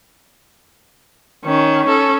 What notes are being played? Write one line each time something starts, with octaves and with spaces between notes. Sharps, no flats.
D#3 C#4
C#4 A4